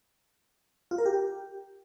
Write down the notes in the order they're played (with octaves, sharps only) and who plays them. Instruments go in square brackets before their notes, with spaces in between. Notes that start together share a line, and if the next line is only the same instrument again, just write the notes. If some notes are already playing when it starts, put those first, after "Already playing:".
[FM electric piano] F4
A#4
G4